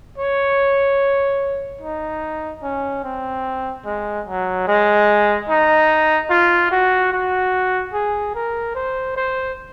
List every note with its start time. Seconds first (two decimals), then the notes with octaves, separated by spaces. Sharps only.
0.18 C#5
1.81 D#4
2.63 C#4
3.04 C4
3.85 G#3
4.27 F#3
4.67 G#3
5.49 D#4
6.30 F4
6.71 F#4
7.12 F#4
7.94 G#4
8.35 A#4
8.75 C5
9.16 C5